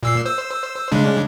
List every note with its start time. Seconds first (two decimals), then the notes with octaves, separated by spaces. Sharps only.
0.03 A#2 E6 C7
0.26 C5 E6
0.92 C#3 G#3 D4